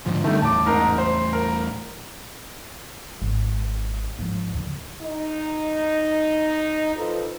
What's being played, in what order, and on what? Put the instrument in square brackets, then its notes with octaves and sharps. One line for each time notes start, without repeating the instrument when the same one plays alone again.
[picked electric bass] G#2 D3 F3
[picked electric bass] D3 G3 [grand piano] D#3 A3
[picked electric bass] E2 A2 [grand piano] A5 D6
[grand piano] G#2 A#4 A#5
C5
A#4
[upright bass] D#1 G#1
G#2 F3
D#2 D3
[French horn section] D#4
F3 D#4 F4 A4 B4